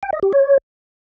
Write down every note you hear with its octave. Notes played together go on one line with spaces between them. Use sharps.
G5
D#5
G4
C#5